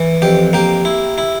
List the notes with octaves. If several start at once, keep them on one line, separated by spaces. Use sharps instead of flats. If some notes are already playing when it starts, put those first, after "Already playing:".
Already playing: E3
F2 G4
A#3 G4
E4
E4